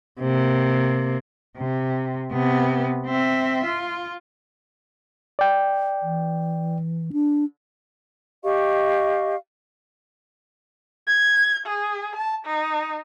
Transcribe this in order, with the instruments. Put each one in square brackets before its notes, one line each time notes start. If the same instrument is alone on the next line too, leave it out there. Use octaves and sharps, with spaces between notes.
[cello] C3 A#3
C3
C3 B3
C4 E5
F4
[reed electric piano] D5 G5
[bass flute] E3
D4
[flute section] G4 D#5 F5 C#6
[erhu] G#6
G#4
A5
D#4